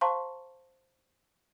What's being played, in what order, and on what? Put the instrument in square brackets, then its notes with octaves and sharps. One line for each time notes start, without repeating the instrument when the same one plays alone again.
[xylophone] C5 F5 A5 A#5 C6 C#6